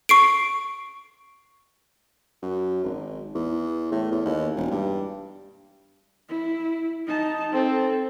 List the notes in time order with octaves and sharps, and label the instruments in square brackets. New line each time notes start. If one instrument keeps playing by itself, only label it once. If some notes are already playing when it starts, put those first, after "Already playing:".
[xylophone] C#6 C7 D7
[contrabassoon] F#2
G#1
E2
A2
E2
D#2
E1
G2
[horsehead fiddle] E4
D#4 A5
[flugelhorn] C4 [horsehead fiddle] A4